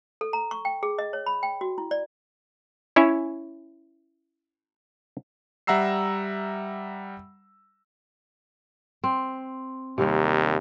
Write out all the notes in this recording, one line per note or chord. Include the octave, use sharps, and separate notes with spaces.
A4
A#5
C#6
G5
G#4
D#5
C#5
B5
G5
F#4
E4
D5
C#4 E4 C#5 E5 G#5
G3 E5 F#5 A#5 E6 C7
C4
D#2 C3 G3 A#3